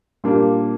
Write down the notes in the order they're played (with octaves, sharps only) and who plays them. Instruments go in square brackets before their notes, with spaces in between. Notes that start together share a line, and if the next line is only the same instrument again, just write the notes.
[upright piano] A#2 G3 A#3 D4